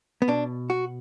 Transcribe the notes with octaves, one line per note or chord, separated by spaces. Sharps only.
B3
B2 D4
F#4